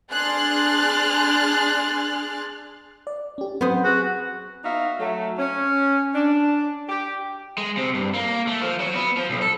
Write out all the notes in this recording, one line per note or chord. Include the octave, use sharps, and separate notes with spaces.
D4 G#4 C6 F6 F#6 A6
D5
C#4 G4
F#3 B3 C4 C5 D#6
F#4 G#4
B3 D#4 F#4 E5 F5
F#3 A3
C#4
D4
G4
G#3
C3
G2
A#3
A3
F3
F#3
B3
F3
B1
A4